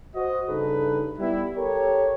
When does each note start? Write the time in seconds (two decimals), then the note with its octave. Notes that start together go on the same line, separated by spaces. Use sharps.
0.15 F#4 C5 D#5
0.47 G2 C#3 D#4 A4 B4
1.19 G3 B3 E4
1.57 G4 A4 A#4 C#5